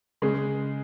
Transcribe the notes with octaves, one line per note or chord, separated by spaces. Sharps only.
C#3 G#3